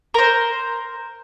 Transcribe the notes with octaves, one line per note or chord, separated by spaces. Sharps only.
A#4 C5